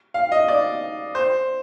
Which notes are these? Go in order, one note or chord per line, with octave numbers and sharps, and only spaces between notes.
F5
D#5
D5
C5